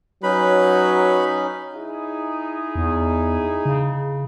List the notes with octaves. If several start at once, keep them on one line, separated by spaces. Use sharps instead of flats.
F#3 C#4 D#4 B4 B5
D#4 E4 G#4
E2
C#3